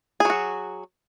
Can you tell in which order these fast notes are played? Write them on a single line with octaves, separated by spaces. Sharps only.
G#4 F#3 F#4